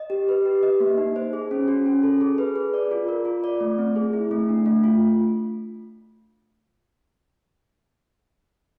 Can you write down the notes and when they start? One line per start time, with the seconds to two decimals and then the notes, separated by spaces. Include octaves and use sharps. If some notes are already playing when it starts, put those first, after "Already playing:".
Already playing: D#5
0.10 G4
0.29 B4
0.45 G4
0.63 D#5
0.80 A#3
0.98 D#4
1.16 C5
1.33 G#4
1.51 C#4
1.68 F#4
1.86 C#4
2.03 A4
2.21 G#4
2.38 B4
2.56 G#4
2.74 D5
2.91 F4
3.08 A#4
3.25 F4
3.44 D5
3.61 A3
3.78 C4
3.96 G#4
4.13 E4
4.31 A3
4.49 D4
4.66 A3
4.84 F4